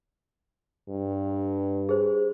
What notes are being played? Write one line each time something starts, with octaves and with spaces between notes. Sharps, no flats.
G2
G#4 C5